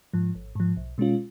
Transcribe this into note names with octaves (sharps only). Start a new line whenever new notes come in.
G#2 F3
G#1
G#2 F3
B1
B2 G#3 C#4 F4